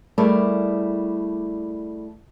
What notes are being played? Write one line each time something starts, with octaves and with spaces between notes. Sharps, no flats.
G3 A3 E4 G#4 A#4 D5